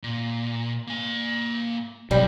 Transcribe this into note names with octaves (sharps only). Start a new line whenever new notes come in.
A#2
A#3 G#5
B1 G2 G3